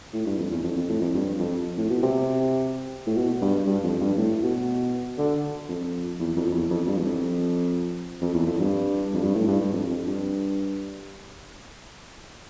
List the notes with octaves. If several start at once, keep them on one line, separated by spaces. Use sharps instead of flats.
A2
G2
F2
E2
F2
F2
A2
F2
G2
F2
A2
B2
C3
A2
B2
G2
G2
F2
G2
A2
B2
D3
F2
E2
F2
F2
E2
F2
G2
E2
F2
F2
E2
F2
G2
F2
G2
A2
G2
G2
F2
F2
G2